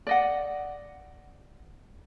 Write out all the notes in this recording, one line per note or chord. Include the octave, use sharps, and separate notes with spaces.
D5 D#5 F#5